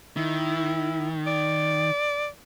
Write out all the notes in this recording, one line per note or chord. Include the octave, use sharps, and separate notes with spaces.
D#3 E4
D5